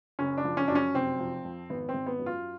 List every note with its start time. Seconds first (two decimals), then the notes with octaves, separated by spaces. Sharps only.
0.19 F#1 C#4
0.38 D4
0.45 F3
0.57 C#4
0.68 F#2 D4
0.75 C#4
0.94 F1 C4
1.19 F3
1.44 F2
1.70 G#1 B3
1.89 C4
1.94 G#1
2.06 B3
2.19 F#2
2.26 F4